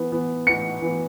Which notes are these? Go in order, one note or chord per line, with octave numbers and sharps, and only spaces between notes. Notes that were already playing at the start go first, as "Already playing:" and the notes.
Already playing: E3 B3
E3 B3
E3 B3 C#7
E3 B3